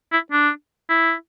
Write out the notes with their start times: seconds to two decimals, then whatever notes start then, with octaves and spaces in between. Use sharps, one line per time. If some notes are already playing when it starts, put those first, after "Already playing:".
0.12 E4
0.32 D4
0.89 E4